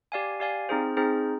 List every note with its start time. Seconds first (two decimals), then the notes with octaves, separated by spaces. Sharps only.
0.12 G4 D5 F5 G#5
0.40 G4 D5 F5 G#5
0.69 C4 D#4 G#4 C5
0.97 C4 D#4 G#4 C5